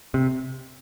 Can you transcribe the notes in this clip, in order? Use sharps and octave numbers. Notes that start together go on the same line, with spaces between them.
C3